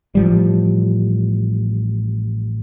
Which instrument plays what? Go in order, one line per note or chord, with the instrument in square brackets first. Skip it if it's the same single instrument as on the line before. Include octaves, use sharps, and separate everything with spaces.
[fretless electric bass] A1 F3 G3